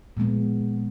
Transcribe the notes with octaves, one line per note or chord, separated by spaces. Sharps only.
A#2 F3 G#3 B3